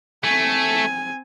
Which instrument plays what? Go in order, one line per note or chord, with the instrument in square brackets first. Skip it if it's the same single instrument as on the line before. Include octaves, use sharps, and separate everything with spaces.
[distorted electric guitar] A3 [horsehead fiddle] C4 G#5